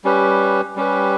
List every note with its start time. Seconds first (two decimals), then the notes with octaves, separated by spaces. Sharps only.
0.04 G3 C#4 G4 B4
0.76 G3 C#4 G4 B4